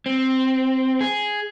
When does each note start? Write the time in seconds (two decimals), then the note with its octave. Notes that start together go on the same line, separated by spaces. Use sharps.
0.06 C4
1.00 G#4